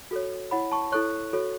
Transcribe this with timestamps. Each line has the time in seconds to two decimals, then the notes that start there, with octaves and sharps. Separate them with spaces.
0.11 F#4 A4 C#5
0.51 E4 C#5 F#5 B5
0.72 A5 C#6
0.92 E4 A4 C#5 C#6 F#6
1.33 F#4 A4 C#5